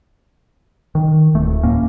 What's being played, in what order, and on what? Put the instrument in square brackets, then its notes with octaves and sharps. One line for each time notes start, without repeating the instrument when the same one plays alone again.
[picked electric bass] D#3
D1 A3
E2 A2 A#3 C#4